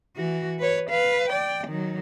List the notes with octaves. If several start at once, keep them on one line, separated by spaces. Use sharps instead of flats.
E3 F#4
B4 C#5
B4 F5
D5 G5
D#3 F#3